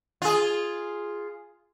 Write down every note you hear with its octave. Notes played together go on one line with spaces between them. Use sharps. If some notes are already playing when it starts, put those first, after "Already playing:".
F4 G#4